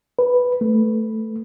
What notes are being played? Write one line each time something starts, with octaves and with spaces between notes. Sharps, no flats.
B4
A3